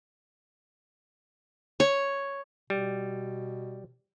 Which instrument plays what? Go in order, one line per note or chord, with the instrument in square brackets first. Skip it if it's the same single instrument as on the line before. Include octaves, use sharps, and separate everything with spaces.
[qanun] C#5
[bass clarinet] B2 [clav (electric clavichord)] G3